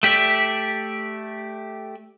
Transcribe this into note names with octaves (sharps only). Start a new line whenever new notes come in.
A3 G4 D5 E5